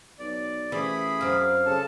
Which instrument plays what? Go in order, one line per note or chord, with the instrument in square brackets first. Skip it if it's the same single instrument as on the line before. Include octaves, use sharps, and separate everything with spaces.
[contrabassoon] B1 [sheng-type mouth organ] D5
[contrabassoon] A1 [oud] E3 [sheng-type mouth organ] G#4 B5
[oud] F#2 C4 [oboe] F5
[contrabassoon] C#3 [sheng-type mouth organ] A4 A5